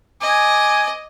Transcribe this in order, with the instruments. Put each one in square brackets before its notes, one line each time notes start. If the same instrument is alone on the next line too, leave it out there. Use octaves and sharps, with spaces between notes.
[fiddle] D#5 [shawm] G#5 [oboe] D6